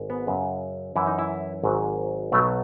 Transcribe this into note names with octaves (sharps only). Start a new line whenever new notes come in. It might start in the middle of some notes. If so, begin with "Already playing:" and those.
Already playing: G#1 G#2
B3
F#2 C#3 F#3
F#2 E3 E4
D#4
E4
G#1 G#2 F#3
B1 B2 F#3 A3